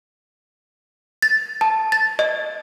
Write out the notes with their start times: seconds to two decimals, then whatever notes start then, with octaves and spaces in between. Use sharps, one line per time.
1.22 A6
1.61 A5
1.92 A6
2.19 D#5